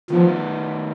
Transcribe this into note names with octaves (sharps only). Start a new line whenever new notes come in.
D#3 F3 B3 D#4 B4